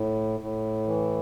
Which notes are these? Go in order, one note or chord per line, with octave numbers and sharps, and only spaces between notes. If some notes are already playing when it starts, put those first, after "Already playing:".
Already playing: A2
A2
E3